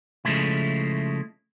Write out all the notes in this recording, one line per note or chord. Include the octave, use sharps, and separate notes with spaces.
C#3 F3 G#3 A3 E4